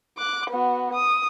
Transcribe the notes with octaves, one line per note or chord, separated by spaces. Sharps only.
D6 F#6
B3 F#4
D#6